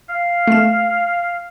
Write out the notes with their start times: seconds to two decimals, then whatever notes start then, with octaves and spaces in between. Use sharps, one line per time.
0.09 F5
0.47 A3 E7